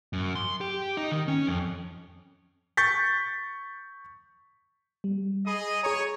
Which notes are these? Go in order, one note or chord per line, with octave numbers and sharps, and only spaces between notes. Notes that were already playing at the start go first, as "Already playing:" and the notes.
F#2
C6
G4
D#4
D#3
C#4
F2
C#6 G6 A6 B6
G3
G#4 D#5 B5 D#6
G#4 C#5 A#5